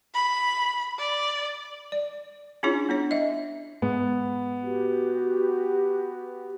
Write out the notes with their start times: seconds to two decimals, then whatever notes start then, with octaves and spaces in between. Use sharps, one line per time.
0.15 B5
0.98 D5
1.92 D5
2.63 C#4 D4 E4 F4 G#4 C#5
2.89 B3 D4 C#5
3.11 D#5 E5
3.82 G#2 B3
4.62 F#4 G4 B4